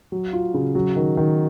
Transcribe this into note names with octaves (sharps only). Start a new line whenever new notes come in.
F#3
F4
C#3
F#3
D#3
D#3